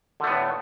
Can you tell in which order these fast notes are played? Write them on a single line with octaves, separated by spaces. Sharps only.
D3 A3 B3 A2